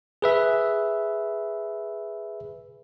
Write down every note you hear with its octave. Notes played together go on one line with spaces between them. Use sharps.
G#4 B4 E5